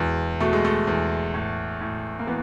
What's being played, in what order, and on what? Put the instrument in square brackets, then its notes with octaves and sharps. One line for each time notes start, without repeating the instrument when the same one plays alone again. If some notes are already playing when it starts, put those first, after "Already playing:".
Already playing: [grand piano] E2 B2 G#3
B2 A3
G#3
A3
E2
A2
A2
A#3
E3 B3